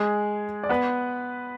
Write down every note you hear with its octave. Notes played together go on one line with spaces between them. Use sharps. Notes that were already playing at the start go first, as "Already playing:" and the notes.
Already playing: G#3 G#4
D5
B3 B4